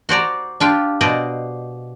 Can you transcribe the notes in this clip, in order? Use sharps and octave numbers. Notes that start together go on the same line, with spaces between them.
F#4 C5 D5 A#5
D4 F4 G4
B2 C5 D5 D#5